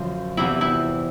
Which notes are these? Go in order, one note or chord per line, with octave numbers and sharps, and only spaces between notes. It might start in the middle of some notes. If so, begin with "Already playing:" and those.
Already playing: F#2 D3 F3 F4
E2 C3 E3 E4
E4